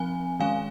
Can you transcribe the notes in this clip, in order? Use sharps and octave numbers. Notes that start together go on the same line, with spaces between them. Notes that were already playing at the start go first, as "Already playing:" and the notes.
Already playing: F3 C4 G#5
D#3 G#3 C#4 F5 G#5